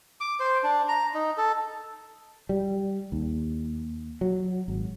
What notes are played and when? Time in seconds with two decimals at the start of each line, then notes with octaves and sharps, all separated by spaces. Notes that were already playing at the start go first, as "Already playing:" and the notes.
0.21 D6
0.40 C5
0.63 D4
0.88 A#5
1.14 D#4
1.38 A4
2.49 G3
3.12 D#2
4.21 F#3
4.68 G#1